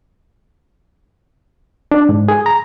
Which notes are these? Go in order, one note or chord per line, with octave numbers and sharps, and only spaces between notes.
D4
G#2
G#4
A#5